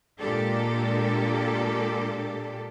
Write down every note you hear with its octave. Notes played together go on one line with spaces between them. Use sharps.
A#2 G#3 A#3 D4 G4 A4